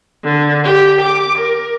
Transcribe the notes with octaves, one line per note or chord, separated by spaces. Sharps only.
D3
G4
D6
A#4